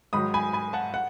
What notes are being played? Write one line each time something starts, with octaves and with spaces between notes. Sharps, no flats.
G#2 D#3 F#3 B5 D#6
G#5 B5
G#5 B5
F#5 A5
F#5